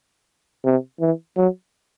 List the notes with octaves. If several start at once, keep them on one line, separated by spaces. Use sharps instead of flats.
C3
E3
F#3